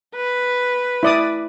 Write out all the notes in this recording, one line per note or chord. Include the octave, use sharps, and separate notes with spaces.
B4
E4 D5 D#6